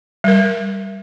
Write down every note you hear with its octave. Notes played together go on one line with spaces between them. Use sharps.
G3 A#4